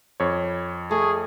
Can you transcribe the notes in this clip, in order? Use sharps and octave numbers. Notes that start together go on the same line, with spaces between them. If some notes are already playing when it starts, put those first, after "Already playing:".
F2 C#5
A3 G#4